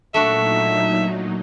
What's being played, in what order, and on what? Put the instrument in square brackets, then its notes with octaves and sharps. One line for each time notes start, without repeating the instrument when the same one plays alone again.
[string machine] A#2 F#3 D#4 [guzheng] A3 D4 F#4 [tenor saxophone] E5